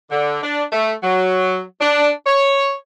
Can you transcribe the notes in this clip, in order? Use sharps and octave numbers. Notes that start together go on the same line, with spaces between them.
D3
D4
A3
F#3
D4
C#5